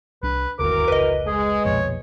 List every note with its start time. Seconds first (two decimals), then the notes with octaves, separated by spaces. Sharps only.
0.23 C2 D4 B4
0.59 D1 G1 D#2 E3 F#4 A#4 D6
0.88 F1 C#2 B4 D#5
1.27 G#3 G#4
1.65 B1 F2 A#2 C#5